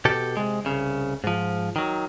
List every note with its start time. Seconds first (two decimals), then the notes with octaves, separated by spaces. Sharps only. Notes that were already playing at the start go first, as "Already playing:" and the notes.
0.05 B2 G4 A4
0.37 C3 G#3
0.65 C2 C#3
1.24 G#2 F3
1.76 D#3 F#3